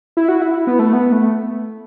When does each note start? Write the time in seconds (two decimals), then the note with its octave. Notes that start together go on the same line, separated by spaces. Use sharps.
0.17 E4
0.28 F#4
0.42 E4
0.67 B3
0.79 A3
0.93 B3
1.12 A3